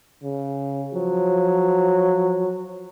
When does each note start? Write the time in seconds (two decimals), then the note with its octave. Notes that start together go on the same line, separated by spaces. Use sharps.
0.23 C#3
0.94 F3 F#3